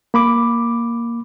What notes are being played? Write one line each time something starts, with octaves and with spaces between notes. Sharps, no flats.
A#3 B5 D6